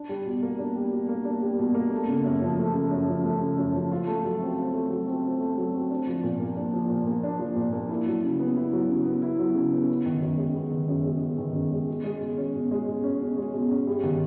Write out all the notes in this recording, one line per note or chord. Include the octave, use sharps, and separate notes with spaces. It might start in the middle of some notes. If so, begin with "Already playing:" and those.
Already playing: D4
G3
B2
A#3
D4
G3
B2
A#3
D4
G3
B2
A#3
A3
C#3
F#2
F3
A3
C#3
F#2
F3
A3
C#3
F#2
F3
F4
A3
F#3
C4
F4
A3
F#3
C4
F4
A3
F#3
C4
D4
F3
A#2
A#3
D4
F3
A#2
A#3
D4
F3
A#2
A#3
E4
F#3
C#3
B3
E4
F#3
C#3
B3
E4
F#3
C#3
B3
B3
D#3
F#2
G#3
B3
D#3
F#2
G#3
B3
D#3
F#2
G#3
B2
G#3
B2
C#4
B2
G#3
B2
C#4
B2
G#3
B2
C#4
G2
D#3